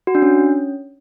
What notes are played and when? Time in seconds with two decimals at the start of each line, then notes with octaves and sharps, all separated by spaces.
0.07 F#4
0.15 D4
0.22 C#4